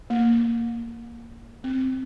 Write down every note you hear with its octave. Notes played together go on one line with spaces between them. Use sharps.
A#3
C4